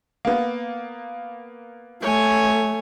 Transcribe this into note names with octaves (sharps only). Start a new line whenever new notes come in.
A#3 B3
A3 C#5 G#5